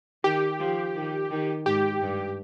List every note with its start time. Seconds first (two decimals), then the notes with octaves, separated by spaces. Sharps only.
0.24 D#3 G4
0.60 F3
0.95 D#3
1.31 D#3
1.66 G#2 G4
2.01 G2